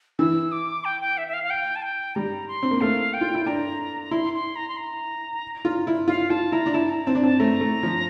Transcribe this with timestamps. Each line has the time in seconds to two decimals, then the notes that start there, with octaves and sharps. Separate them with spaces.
0.19 E3 E6
0.52 D6
0.85 G5
1.01 G5
1.18 E5
1.28 E5
1.34 F5
1.44 F5
1.50 G5
1.76 A5
1.82 G5
2.15 G3 A#5
2.48 C6
2.63 C4
2.71 A#3
2.81 A3 F5
3.14 G5
3.21 F4
3.34 E4
3.46 D4 A#5
4.11 E4 C6
4.34 C6
4.56 A#5
4.69 C6
4.77 A#5
5.65 F4
5.87 E4
6.08 F4 F5
6.30 F4 A5
6.52 E4 A#5
6.66 D4
6.74 E4 A5
6.90 A#5
7.07 C4 A5
7.15 D4
7.23 C4 A5
7.39 A3 A#5
7.61 A3
7.83 F3